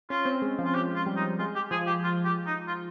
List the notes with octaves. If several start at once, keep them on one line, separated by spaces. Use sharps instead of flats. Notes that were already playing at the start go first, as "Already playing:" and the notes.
C#4 F4
C4
G#3
F3
F4
G4
F4
G3
D#4
G#3 F4
G4
F3 G#4
G4
F4
G4
D#4
F4